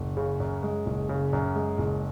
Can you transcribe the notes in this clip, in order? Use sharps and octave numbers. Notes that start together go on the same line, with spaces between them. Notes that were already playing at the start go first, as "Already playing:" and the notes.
Already playing: F#1
C#3
F#2
G#3
F#1
C#3
F#2
G#3
F#1